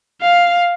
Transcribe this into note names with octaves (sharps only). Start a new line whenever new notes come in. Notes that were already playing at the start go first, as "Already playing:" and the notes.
F5